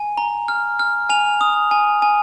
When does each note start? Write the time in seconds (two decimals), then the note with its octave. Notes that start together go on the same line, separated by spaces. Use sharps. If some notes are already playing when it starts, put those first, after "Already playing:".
Already playing: G#5
0.17 A#5
0.48 F6
0.79 F6
1.09 G#5 F7
1.41 D#6
1.71 G#5
2.02 G#5